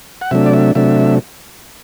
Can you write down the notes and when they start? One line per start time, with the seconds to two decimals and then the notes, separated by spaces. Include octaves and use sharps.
0.21 F#5
0.31 C3 F#3 A3 D4 E5
0.46 D5
0.53 E5
0.75 C3 F#3 A3 D4 E5